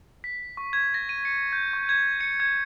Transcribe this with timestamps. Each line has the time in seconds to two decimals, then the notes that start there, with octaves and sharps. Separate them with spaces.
0.24 B6
0.57 C#6
0.73 G#6
0.94 A#6
1.09 D#7
1.25 C#7
1.53 G6
1.73 C#6
1.89 G#6
2.20 C#7
2.40 G#6